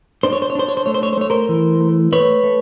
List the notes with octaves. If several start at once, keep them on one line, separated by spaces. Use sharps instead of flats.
D4 C5
C#5
C5
C#5
D4 C5
C#5
C5
A3 C#5
C5
C#5
C5
A3 C#5
A#4 C5
E3
A3
A3 B4 C#5
A3